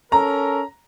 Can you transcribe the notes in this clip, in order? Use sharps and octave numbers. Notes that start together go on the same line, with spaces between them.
C#4 A4 A#4 A#5